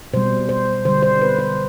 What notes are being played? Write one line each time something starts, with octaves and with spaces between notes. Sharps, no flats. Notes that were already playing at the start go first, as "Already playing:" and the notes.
B2 G3 C5
C5
D3 G3 C5
C5
B4
C5